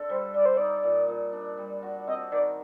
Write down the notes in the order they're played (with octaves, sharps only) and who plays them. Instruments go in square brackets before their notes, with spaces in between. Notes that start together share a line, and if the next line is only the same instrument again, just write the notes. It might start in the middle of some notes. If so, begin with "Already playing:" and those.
Already playing: [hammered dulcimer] D3 C4 A4
[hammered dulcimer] G3 [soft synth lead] C5
[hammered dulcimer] G3 [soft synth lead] D5
[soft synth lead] C5
[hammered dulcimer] D#4 [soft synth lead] D5
[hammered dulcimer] A#2
A#2
D4
G3
F#4
[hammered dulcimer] C4 [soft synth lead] D#5
[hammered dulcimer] D#3 [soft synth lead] D5